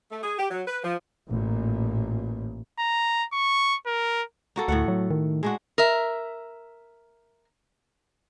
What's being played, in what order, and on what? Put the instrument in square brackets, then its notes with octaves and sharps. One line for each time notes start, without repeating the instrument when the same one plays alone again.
[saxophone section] A3
G#4
G4
F#3
B4
F3
[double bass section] A1 A#2
[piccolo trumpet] A#5
C#6
A#4
[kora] A#3 F#4 A4
[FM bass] D2 [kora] A2 A3 F#5
[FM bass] F#3
D#3
[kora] G#3 D4 F#4
[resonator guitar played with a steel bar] A#4 E5